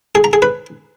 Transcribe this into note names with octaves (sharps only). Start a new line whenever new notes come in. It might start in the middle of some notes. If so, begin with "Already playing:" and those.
G#4
A#5
G#4
B4